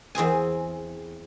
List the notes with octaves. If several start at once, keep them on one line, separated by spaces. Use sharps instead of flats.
E2 C4 G#4 G#5